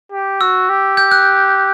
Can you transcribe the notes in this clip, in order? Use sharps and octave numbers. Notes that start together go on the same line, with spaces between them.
G4
F#4 E6
G4
G6
F#6